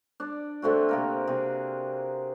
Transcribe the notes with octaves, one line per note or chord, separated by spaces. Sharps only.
D4 D5
D3 A3 C4 F#4
C3 A#3 A#4
C3 G#4